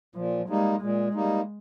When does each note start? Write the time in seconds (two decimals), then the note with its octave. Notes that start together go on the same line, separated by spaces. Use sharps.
0.15 A#2 F3
0.48 G3 G#3 A#3 D#4
0.81 A#2 G#3
1.14 G3 A#3 D#4